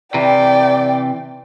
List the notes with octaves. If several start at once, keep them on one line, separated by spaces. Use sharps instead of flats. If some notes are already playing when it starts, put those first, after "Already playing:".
C3 E3 D5 G5